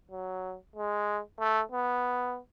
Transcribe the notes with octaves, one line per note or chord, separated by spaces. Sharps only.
F#3
G#3
A3
B3